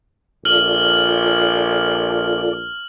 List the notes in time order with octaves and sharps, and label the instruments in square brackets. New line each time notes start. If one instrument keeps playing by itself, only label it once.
[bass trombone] A#1 [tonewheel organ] F4 A4 D5 [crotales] F6 F#7